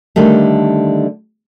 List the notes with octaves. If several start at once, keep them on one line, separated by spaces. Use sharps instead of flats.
D3 D#3 G3 A3